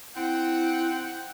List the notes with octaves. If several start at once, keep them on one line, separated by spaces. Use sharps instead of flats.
C4 E4 F#5 G5